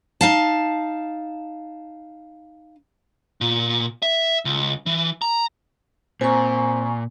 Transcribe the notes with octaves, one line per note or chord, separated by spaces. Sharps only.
D#4 F5 A5
A#2
E5
C#2
E3
A#5
A#2 C4 G#5 A#5 C#6